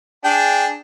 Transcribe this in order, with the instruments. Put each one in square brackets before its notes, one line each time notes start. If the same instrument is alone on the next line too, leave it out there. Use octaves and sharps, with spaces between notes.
[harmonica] D4 G#4 G5